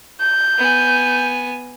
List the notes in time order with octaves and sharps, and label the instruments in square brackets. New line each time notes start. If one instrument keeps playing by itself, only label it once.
[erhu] G6
[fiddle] B3 G#5